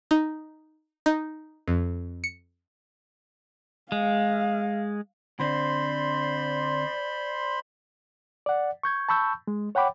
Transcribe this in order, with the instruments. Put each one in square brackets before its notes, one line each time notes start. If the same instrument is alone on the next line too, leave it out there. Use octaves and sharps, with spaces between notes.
[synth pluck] D#4
D#4
F2
C#7
[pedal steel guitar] G#3 [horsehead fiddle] F5
[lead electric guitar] D3 C4 [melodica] C5 B5 C6 [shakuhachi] D5
[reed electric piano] D5 F#5
C#6 G6 G#6
A5 B5 C#6 E6 G6
G#3
C#5 F#5 G5 B5 D6